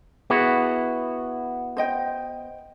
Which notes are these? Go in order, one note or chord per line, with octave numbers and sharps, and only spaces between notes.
B3 E4 F#4 G#4
C5 D#5 G5